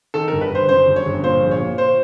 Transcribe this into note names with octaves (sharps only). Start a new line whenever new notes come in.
D#3 A4
G1 A#4
B4
G1 C5
F#2 C5
G1
C#5
G1
A#2 C5
A#1
C#5
A#2
C5